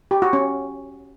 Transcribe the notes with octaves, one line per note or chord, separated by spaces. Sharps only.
G4
F#4
C#4